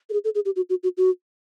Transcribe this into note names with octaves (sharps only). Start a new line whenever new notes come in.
A4
G#4
A4
G#4
G4
F#4
F#4
F#4
F#4